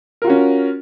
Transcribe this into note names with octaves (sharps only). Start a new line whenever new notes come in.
C#4 F4 F#4 A#4